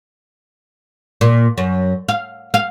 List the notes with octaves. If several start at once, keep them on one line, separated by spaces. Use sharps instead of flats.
A#2
F#2
F5
F5